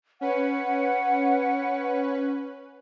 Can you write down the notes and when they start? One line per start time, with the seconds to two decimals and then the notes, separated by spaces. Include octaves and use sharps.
0.21 C#4 B4 F#5